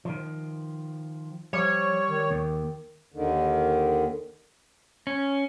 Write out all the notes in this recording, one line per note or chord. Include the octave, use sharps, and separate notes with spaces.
D#3 F3
F3 G3 C#5
D#3
D#2
D#2 D3 D#3
C#4